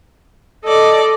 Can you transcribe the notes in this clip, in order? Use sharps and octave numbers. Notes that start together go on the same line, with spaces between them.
A4 D5 D#5